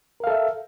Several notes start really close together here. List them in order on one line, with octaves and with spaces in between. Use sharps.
A#4 F5 A4 E5